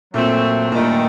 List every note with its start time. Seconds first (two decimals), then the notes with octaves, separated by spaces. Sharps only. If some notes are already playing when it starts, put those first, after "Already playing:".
0.13 A#2 F#3 A3 C4
0.72 G2 A#2 D#3 A3